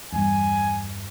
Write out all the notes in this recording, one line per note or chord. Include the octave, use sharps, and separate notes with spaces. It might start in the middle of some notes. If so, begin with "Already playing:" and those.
E2 G2 G#5